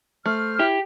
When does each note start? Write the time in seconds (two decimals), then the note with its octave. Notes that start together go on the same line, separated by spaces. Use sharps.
0.26 A3 C5 F6
0.59 E4 G4